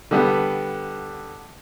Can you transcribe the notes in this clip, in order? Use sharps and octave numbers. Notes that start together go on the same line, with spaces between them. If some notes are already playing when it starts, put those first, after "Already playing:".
D3 G3 B3